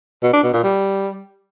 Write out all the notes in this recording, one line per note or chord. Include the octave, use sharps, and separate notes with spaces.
B2
D4
B2
A#2
G3